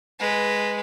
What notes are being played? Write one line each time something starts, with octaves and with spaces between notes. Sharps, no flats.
G#3 B4